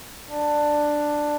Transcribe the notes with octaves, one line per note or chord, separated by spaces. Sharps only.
D4